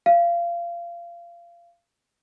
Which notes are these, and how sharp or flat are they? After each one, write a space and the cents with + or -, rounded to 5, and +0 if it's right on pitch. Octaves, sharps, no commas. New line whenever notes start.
F5 -25